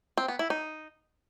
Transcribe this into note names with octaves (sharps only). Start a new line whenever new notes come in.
C4
B3
E4
D#4